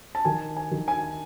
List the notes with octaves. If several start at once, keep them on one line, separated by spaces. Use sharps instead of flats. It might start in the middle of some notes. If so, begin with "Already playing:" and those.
A5
D#3 G#5
G#5
D#3
G#5